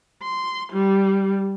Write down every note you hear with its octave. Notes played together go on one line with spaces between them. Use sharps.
C6
G3